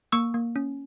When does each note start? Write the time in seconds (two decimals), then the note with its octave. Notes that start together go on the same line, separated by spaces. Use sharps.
0.12 A#3 C#6 E6
0.34 A#3
0.56 C#4